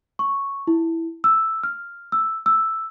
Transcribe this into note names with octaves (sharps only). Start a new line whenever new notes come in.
C#6
E4
E6
F6
E6
E6